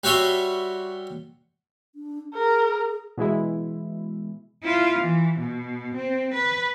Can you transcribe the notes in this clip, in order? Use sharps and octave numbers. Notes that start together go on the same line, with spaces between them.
G3 F#4 C#5 E5 C6
D4
G#4 A#4
B2 E3 G#3 E4
E4 F4
E3
B2
C4
B4